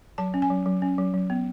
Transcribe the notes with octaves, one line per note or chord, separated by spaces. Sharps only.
F#3 A5
C#4
G#5
F#3
F#3
C#4
F#3
F#3
B3